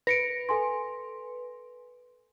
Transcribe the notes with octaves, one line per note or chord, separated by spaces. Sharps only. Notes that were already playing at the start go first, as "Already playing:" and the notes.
B4 A#6 C#7 D7
A4 G#5 C6